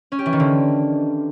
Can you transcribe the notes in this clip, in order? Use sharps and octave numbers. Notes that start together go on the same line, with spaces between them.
C#4
G4
E3
D#3
D3